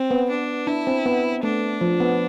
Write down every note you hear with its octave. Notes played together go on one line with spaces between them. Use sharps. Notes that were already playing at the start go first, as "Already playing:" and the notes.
Already playing: C4
B3
D4
D4 E4
C4
B3
A3 D4
F3
B3